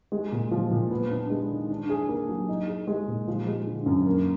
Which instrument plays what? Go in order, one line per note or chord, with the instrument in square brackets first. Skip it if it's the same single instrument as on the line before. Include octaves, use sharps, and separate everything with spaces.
[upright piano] G#3
A#2
F3
A#2
B3
D4
G#3
D#3
D4
G#4
A#3
F#3
D#4
G#4
G#3
A#2
F3
G#3
D3
F#2
A#3